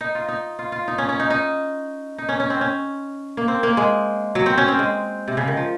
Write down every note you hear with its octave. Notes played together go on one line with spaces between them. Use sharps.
D#4
F4
D#4
F4
F4
D#4
C#4
C#4
D#4
D#4
D#4
C#4
C#4
C4
C#4
A#3
C4
A#3
G#3
F#3
C4
C#4
C4
G#3
C3
C#3
D#3
F3